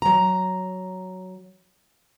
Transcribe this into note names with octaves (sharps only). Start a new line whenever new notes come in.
F#3 A#5